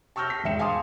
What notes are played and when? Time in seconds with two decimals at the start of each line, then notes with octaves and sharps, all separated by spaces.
0.16 A5 C#6 E6 F6 G6 A#6
0.30 B6
0.44 E1 G#2 E5 G5 C#7 E7
0.59 F5 G#5 A5 C6 D6 D#6